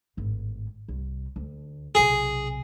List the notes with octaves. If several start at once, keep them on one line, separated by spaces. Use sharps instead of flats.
G#1 A2
C2
D2
B1 C3 G#4